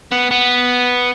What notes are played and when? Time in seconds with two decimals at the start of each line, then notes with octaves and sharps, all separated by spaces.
0.12 B3
0.31 B3